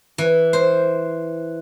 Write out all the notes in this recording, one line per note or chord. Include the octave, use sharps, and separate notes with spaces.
E3
C5